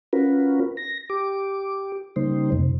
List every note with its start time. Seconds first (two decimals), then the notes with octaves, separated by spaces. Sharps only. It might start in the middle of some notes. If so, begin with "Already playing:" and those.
0.13 C#4 F4 F#4 A#4 B4
0.77 A#6
1.10 G4 D6
2.16 C#3 G3 A#3 D#4 C5
2.52 F2 C3